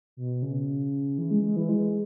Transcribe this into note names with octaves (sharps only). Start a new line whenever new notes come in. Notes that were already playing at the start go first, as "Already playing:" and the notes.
B2
C#3
E3
G#3
G#3
E3
G#3